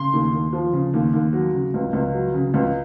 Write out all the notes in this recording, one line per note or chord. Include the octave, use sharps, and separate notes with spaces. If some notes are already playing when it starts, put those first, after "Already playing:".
Already playing: C#3 C6
D#2
D#2
F3
C#3
D#2
D#2
F#3
C#3
C#2
C#2
F#3
C#3
C#2